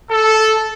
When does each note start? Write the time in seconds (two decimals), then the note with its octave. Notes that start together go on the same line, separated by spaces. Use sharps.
0.10 A4